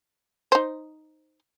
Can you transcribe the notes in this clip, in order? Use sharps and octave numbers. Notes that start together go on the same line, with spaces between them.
D#4 C5